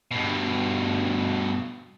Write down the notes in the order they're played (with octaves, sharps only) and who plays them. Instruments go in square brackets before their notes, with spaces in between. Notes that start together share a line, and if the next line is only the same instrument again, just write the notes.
[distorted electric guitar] G2 B2